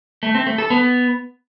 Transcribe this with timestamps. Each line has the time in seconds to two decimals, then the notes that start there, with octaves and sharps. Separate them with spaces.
0.23 A3
0.35 C4
0.47 A3
0.58 A4
0.70 B3